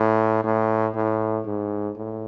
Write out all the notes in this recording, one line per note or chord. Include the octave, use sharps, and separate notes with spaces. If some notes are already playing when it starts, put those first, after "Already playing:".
Already playing: A2
A2
A2
G#2
A2